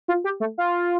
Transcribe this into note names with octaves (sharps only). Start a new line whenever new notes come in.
F4
G4
A3
F4